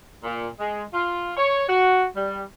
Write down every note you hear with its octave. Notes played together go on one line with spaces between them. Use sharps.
A#2
G#3
F4
C#5
F#4
G3